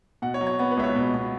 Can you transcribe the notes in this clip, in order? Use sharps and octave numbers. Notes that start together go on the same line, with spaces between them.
B2 F#5
C#5
F#3
C#5
B3 C#5
B4
C#2 E5
C#5
B2
B2